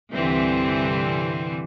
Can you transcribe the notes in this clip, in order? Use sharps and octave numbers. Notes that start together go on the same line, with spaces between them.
C2 G2 D3 E3 G3 C4